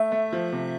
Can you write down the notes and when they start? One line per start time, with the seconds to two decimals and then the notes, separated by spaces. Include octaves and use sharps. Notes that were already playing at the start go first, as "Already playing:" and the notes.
Already playing: A3 E5
0.12 A3
0.32 F3
0.53 C3